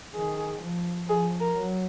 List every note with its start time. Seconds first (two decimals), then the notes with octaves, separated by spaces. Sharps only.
0.15 D#3 G#4
0.62 F3
1.09 F3 G#4
1.41 A#4
1.56 F#3